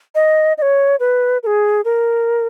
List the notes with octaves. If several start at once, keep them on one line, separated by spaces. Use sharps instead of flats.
D#5
D#5
C#5
B4
A#4
G#4
A#4